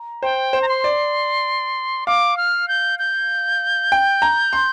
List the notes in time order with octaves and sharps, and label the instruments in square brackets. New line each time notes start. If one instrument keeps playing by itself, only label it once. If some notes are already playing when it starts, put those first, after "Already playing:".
Already playing: [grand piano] A#5
[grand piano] C5 [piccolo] G5
[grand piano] C5
[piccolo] A#5
C6
[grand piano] D5
[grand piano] F5 [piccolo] D6
[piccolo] F6
G6
G6
[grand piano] G5
A#5
C6